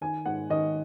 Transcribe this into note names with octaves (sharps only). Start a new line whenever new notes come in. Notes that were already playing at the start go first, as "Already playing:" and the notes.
D#3 G#5
G#2 F#5
D#3 D#5